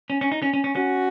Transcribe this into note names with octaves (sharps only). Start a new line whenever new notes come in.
C#4
C#4
D#4
C#4
C#4
C#4
C#4 F#4